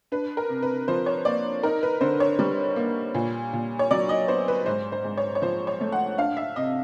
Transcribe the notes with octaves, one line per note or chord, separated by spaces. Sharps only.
D4 B4
A#4
C3
B4
F3 C5
C#5
A#3 D5
D#4 A#4
B4
D3 C5
C#5
G3
A#3
A#2
A#2
C#5
F#3 D5
D#5
B3 C5
B4
G#2 C5
C5
G#2
C#5
C#5
F3 C5
C#5
A3
F#5
D4 F5
E5
C3 D#5